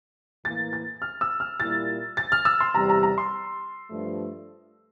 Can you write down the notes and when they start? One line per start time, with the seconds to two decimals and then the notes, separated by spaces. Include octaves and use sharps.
0.45 A2 E3 A#3 E4 A6
0.73 A6
1.02 F6
1.21 E6
1.40 F6
1.60 A#2 G3 A#3 E4 A6
2.17 A6
2.32 F6
2.45 E6
2.61 C6
2.75 E2 C3 G3 A#5
2.89 A#5
3.03 A#5
3.18 C6
3.89 G2 F3 A3